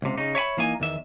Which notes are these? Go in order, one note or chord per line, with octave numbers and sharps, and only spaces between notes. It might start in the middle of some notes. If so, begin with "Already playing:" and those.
C#2 C3
C#3 D#4
C#5 E5 G#5 B5
E3 A#3 D#4 G#5
E2 D#3 E5